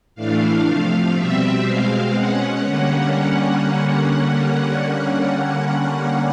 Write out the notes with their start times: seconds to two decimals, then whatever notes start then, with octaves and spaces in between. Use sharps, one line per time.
0.15 A2 E3 A3 D4 F5
0.64 C3 F3 A3
1.13 B2 G3 C4 E5
1.64 B2 G#3 C4 F5
2.13 B2 G#3 C#4 F#5
2.63 D3 G3 A#3 C#4